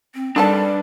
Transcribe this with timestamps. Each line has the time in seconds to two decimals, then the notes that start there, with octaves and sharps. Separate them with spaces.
0.14 C4
0.36 D#3 G3 D4 A4 B4 D5 A5